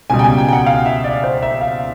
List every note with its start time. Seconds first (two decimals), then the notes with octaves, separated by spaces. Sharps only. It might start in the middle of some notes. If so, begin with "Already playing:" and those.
0.10 C#2 B2 G3 G#5
0.19 G5
0.24 G#5
0.38 G5
0.49 G5
0.53 F#5
0.66 F5
0.85 E5
1.04 D5
1.24 C5
1.42 E5
1.61 F5